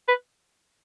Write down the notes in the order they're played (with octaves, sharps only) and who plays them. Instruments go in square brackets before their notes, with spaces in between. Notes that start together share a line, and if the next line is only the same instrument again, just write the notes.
[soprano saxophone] B4